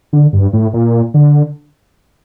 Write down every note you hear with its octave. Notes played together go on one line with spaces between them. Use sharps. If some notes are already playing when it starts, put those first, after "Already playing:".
D3
G2
A2
A#2
D3